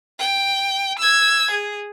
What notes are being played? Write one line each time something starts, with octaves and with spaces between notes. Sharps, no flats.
G5
E6 G#6
G#4